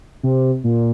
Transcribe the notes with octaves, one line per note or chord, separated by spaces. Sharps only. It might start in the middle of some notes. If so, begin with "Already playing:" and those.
C3
A#2